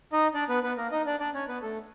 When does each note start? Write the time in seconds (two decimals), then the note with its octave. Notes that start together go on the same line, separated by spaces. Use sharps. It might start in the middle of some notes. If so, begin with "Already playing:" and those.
0.13 D#4 D#5
0.34 D4 D5
0.49 B3 B4
0.63 B3 B4
0.77 A#3 A#4
0.92 D#4 D#5
1.06 D4 D5
1.20 D4 D5
1.34 C#4 C#5
1.48 B3 B4
1.62 A3 A4